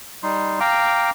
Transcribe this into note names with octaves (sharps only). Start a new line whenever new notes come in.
G3 D#4 C6
F5 G5 A#5 D6